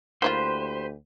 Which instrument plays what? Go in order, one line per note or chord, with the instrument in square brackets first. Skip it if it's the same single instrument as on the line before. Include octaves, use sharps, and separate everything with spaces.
[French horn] D2 [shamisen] A#3 E4 F4 [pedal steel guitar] G4 B4 C6 [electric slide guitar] C5